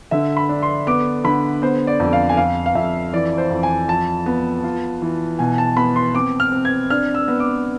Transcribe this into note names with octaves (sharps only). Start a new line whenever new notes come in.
D3 E5
B5
D4
C6
B3 D6
D3 B5
B3 C5
D5
F2
F5
G#5
F2 F5
F5
F2 E5
E3 D5
C5
F2
G#5
F3 A5
B3
F4
E3
B2 G#5
A5
B3 B5
C6
C4 D6
F6
C4
G#6
D4 F6
E6
B3
D6